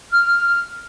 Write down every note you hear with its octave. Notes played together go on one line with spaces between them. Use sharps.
F6